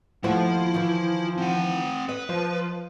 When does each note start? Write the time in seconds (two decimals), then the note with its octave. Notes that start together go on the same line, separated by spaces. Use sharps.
0.24 D#2 F3 A3 E4 F#5
0.74 D#3 E3
1.38 C4 F#5
2.09 B4 D#5
2.29 F3